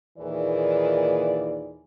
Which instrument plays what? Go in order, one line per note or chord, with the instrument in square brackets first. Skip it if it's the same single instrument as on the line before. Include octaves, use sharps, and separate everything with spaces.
[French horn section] D#2 A#2 D#3 E3 G#4 D5